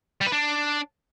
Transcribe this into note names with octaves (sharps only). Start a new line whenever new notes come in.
G3
B4
D4